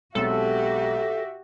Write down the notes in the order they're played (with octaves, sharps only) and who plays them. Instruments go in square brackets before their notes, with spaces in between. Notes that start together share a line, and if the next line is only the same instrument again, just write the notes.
[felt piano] B1 G#3 C4 [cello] F#4 G4 [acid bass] A4 [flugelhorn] E5